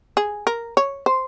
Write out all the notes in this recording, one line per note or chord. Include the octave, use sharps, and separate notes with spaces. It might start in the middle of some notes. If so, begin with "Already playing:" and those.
G#4
A#4
C#5
C5